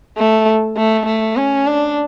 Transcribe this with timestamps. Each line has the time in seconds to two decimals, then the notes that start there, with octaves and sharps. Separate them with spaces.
0.17 A3
0.77 A3
1.07 A3
1.37 C#4
1.67 D4